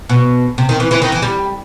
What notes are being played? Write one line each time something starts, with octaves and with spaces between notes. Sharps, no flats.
B2
C3
D#3
E3
E3
D#3
E3
G3